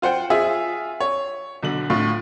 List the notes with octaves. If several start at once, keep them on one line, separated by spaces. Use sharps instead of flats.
F4 C5 F#5 G5
F4 G#4 E5
C#5
B1 D3 F#7
A2 D3 F4